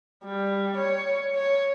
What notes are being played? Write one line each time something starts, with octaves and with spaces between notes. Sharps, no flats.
G3
C#5
C#5